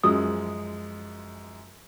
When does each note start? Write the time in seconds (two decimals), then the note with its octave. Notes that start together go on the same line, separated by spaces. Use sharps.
0.04 F#2 F3 G#3 D#6